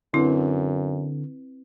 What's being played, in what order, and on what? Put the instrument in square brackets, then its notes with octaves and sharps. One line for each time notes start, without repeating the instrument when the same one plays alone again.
[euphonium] F#2 [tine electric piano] D3 [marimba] C4 B4 [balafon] E4